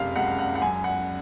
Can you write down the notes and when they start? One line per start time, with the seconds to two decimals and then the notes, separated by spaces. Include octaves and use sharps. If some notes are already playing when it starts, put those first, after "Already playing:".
Already playing: F#1 F2 C3 F5
0.16 C#2 F#5
0.39 F#5
0.55 F#5
0.62 F#2 G#5
0.84 F#5